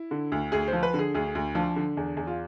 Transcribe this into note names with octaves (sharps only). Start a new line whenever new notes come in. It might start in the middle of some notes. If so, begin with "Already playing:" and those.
Already playing: E4
D3
D2
D2 G#4
C5
F3
B4
D3
G#4
D2 G#4
D2
F3 D4
D3
E2
E2
F4